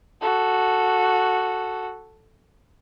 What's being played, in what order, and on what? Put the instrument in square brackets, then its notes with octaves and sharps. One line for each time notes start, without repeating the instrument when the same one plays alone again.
[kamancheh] F#4 A4